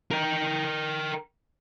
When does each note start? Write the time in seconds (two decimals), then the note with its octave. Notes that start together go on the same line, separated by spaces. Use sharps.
0.11 A#4 G5